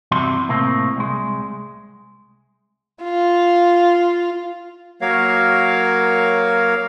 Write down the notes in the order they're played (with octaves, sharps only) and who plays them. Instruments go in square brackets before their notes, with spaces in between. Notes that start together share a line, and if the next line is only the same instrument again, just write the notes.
[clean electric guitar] E2 G2 C3 E4 F#4 C6
A2 C3 A#3 C4
C2 G#3
[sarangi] F4
[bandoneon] F#3 A#3 F#4 A#4 C#5 F5